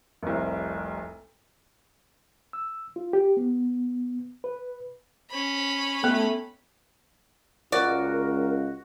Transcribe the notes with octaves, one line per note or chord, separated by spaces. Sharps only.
F1 C2
E6
F4
G4
B3
B4
C#4 B5
A3 B3 A4
C#2 F#4 A#4 D5